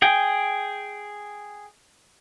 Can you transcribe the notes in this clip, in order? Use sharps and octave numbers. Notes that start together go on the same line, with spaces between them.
G#4 G5